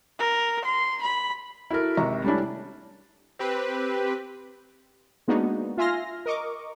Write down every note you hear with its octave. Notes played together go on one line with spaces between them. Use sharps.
A#4
C6
B5
E4 F#4 A4 A#4
G#1 C3 E5 A#5 C#6
G3 A3 C#4 D4 E4
C4 G4 B4
G#3 A#3 B3 D4 D#4 F#4
F4 E5 G#5 C6 F6 A#6
A#4 D#5 C#6 D6